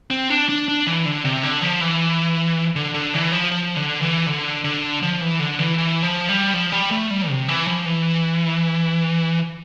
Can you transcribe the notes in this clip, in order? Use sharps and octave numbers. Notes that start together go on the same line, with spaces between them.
C4
D4
D4
D4
E3
D3
C3
D3
F3
E3
D3
D3
E3
F3
F3
D3
E3
D3
D3
F3
E3
D3
E3
E3
F3
G3
F3
G3
A3
G3
C3
E3
F3
E3